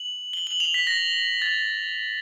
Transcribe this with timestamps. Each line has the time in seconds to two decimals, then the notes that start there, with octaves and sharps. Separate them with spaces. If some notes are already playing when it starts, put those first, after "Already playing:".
Already playing: F#7
0.33 G7
0.47 F#7
0.60 F7
0.74 B6
0.87 A#6
1.42 A6